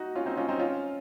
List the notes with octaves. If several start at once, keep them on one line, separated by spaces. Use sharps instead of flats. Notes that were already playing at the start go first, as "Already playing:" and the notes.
Already playing: D#4 F#4
C#4 F4
C4 D#4
C#4 F4
C4 D#4
C#4 F4